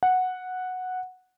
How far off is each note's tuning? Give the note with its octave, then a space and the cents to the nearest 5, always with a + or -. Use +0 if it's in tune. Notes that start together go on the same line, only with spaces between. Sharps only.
F#5 -5